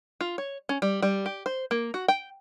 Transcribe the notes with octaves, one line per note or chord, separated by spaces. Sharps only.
F4
C#5
C#4
G3
G3
G4
C5
A#3
F#4
G5